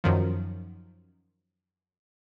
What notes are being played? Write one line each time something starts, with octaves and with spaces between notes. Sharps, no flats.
F#2 D#3 F3